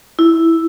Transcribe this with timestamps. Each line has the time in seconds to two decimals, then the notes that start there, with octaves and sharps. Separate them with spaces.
0.19 E4